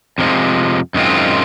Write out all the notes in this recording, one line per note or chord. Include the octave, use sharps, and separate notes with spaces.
F2 C3 F3 G#3
F#2 D#3 G#3 C4 F4